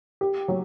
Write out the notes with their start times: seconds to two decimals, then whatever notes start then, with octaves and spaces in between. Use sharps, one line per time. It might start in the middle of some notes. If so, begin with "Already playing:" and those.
0.21 G4
0.48 F#3